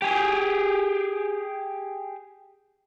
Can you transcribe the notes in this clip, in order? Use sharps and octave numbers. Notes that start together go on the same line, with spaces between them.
G4 G#4